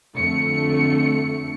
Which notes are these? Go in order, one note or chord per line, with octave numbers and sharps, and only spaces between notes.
F2 D3 A3 C#7